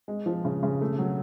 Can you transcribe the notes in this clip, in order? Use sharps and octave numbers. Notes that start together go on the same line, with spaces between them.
G#3
F3
C#3
C#3
A3
F#3